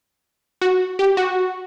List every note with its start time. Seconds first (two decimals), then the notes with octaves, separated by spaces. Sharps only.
0.61 F#4
0.99 G4
1.17 F#4